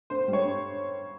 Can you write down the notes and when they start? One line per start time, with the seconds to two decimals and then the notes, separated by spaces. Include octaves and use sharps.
0.10 D3 C5
0.28 G3
0.33 C#5
0.45 G2